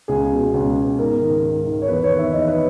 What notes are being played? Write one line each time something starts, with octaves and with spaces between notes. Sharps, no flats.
C#2 G#4
B2
C#2
B2
G#2 A#4
D#3
G#2
D#3
C#5
E2 B4
C#5
D#3
E5
E2 D#5
B4